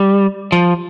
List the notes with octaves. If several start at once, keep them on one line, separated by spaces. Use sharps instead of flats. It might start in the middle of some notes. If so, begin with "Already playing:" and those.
Already playing: G3
F3